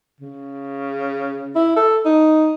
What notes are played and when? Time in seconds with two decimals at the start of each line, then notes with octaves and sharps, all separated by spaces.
0.21 C#3
1.55 E4
1.76 A4
2.06 D#4